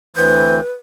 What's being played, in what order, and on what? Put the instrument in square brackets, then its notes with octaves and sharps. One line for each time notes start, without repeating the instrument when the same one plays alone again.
[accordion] D2 E3 C4 [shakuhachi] B4 [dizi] G6